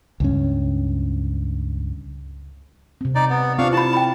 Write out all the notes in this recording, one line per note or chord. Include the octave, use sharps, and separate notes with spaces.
C#2 G2 C#4
C3 C4
D#4 D5
B3
C4 D4 F4 F5 C#6
E4 A5 B5
G5 B5